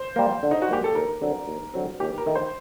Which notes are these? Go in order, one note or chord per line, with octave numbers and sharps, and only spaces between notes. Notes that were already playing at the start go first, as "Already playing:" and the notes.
Already playing: C5
G3 A#3
D3
D#4
F#4
G3 A#3 G4
A4
D#2 A#4
D3 F#3 C4
D#2
D3 F#3 C4
D#2 G4
A#4
D#3 A3
C5